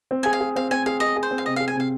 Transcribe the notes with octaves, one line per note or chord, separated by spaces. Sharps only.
C4
G#4 G#5
F5
G#4
C4 F5
C4 G#5
G#4 F5
G#4 D#5
G#4
C5
C4
F5
C3 D#5
F5
G#4
G#5
C3 F5